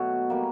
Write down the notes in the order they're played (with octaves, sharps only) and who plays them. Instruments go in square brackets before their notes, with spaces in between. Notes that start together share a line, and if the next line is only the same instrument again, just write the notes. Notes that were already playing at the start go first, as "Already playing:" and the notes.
Already playing: [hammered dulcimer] B2 F#3 A3 C#5
G3 A#3